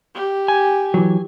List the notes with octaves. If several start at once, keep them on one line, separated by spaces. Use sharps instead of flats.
G4
G#5
E3 F#3